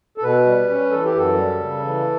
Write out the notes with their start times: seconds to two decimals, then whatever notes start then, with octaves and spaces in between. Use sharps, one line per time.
0.18 A4
0.23 B2 B4
0.46 G3
0.69 C#4
0.91 E3 A4
1.05 G4
1.14 F#2 A4
1.37 G3
1.59 C#3
1.83 E3